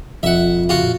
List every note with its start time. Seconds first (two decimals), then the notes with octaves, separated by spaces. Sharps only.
0.23 E1 F2 E5 F#5
0.69 C#3 F4 F#4
0.83 A#2